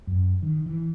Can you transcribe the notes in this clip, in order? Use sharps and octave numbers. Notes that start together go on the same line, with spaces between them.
F#2
D#3
E3